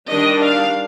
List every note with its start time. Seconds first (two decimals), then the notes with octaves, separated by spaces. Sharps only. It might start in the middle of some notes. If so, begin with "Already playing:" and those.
0.09 D#3 G3 D4 D#5
0.42 F5